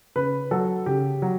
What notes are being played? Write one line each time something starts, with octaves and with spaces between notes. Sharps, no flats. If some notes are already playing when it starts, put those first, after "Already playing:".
C#3 B4
F#3 A4
C#3 G4
F#3